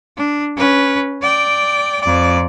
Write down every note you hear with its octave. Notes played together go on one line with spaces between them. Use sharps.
D4
C#4 B4
D5 G5
F2 D5